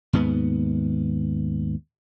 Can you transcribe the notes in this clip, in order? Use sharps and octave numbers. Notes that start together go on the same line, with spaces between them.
D#2 G#2 B3